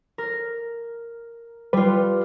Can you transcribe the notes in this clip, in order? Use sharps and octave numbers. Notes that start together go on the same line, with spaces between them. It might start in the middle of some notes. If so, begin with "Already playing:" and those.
A#4
G3 F4 B4